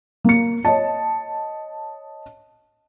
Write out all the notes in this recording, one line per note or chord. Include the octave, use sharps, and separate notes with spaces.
A#3 C#7
C#5 D#5 A5